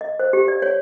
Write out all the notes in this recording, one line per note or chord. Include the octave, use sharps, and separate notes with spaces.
D#5
C5
G4
D5
C#5